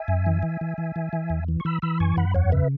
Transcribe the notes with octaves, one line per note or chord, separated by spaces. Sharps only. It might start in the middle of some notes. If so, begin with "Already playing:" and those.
Already playing: E5 G#5
F#2
E3
E3
E3
E3
E3
E3
E2
E3
C#6
E3 B5 E6
E3 B5 E6
F#2 G#5 C#6
F#2 F#5 B5
E2 C#5 F#5
C#3 B4 E5